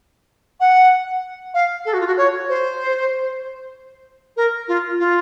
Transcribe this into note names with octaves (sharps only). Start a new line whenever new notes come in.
F#5
F5
A4
F#4
F4
F#4
C#5
C5
A#4
F4
F4